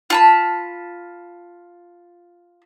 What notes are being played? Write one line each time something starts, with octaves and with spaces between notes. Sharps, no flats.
F4 A5 B5